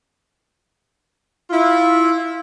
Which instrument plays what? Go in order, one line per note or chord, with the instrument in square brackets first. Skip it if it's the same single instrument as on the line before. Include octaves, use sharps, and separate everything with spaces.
[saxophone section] E4 F4